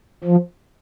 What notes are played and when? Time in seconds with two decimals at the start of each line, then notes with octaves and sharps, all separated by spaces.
0.24 F3